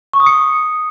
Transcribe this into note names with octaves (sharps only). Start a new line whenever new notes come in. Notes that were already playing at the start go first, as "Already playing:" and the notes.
C#6
D#6
C#7